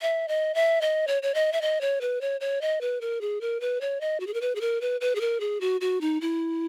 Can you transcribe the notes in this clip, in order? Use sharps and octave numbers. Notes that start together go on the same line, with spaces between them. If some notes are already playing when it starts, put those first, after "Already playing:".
E5
D#5
E5
D#5
C#5
C#5
D#5
E5
D#5
C#5
B4
C#5
C#5
D#5
B4
A#4
G#4
A#4
B4
C#5
D#5
F#4
G#4
A#4
B4
G#4
A#4
B4
B4
G#4
A#4
G#4
F#4
F#4
D#4
E4